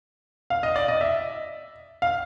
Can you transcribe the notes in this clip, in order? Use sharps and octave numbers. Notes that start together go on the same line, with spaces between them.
F5
D#5
D5
D#5
E5
F5